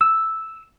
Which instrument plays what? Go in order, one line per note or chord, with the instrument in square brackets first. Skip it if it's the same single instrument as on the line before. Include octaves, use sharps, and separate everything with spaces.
[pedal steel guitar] E6